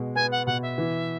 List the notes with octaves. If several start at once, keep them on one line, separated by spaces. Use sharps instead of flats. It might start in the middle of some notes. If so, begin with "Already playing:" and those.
Already playing: B2 G#3
B3 G#5
F#5
B2 F#5
E5
E3